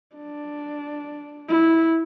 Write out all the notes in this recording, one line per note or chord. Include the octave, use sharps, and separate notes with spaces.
D4
E4